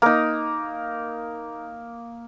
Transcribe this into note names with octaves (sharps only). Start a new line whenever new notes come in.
A#3 D#4 A#4